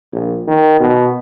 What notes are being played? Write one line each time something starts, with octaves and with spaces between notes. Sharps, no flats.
A#1
D#3
B2